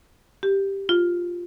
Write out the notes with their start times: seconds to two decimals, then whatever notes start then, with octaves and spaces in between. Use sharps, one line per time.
0.43 G4
0.89 F4